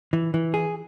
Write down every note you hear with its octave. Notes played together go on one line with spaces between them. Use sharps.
E3
E3
G#4